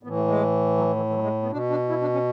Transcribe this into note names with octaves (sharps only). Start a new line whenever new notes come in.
A2 E3 B3
A3
G#3
F#3
E3
E3
F#3
G#3
B3
B2 D4
D4
E4
D4
C#4